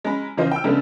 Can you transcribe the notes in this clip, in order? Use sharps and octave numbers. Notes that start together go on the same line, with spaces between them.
G#3 C#4 A#5 B5
C#3 E3 F4 C5 D#5
G5 E6
C#3 G#3 A3 B3 D4